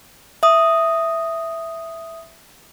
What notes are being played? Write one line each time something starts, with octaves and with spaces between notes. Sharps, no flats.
E5 D#6